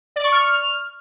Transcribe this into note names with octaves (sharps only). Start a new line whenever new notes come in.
D5
C#6
F6